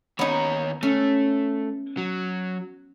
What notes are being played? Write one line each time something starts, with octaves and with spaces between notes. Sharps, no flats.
D#2 B3 D#4 C#5
A3 C#4
F#3